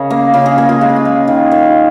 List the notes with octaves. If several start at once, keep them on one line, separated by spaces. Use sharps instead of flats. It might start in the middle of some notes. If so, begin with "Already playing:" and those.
Already playing: C#3 G#4 A#4 D#5
A#3
C#3 F4
G#4
A#3 G#4
F4
G#3 F4
G#4
F4
G#3
D#3
D#3